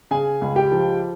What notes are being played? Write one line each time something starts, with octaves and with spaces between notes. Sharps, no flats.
C#3 G#4 G#5
C#2
G4 G5
F3